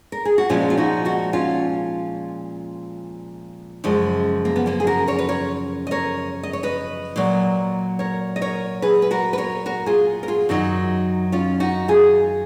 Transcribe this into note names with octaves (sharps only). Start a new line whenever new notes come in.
A#4
G#4
F#4
A#2 F3 G#3 C#4 F4
F4
D#4 F#4
D#4 F#4
C#4 F4
F#2 C#3 F3 G#3
A#3
B3
A#3 C#4
G#4
F#4 A#4
A#4 C#5
B4
A#4 C#5
D#5
A#4 C#5
D#5
C#5
B4 D#5
A#2 F#3
A#4 C#5
D#5
A#4 C#5
G#4 B4
B4
F#4 A#4
B4
A#4 C#5
F#4 A#4
F4 G#4
A#4
F4 G#4
F#2 D#3 F#3 D#4 F#4
C#4 F4
D#4 F#4
F4 G#4